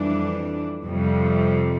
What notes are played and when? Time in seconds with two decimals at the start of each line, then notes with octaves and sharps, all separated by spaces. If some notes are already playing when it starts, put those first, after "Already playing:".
Already playing: F2 E3 G3 D4
0.84 F2 C3 G3